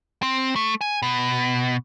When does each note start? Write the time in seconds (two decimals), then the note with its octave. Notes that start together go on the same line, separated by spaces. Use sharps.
0.23 C4
0.56 A3
0.81 G#5
1.02 B2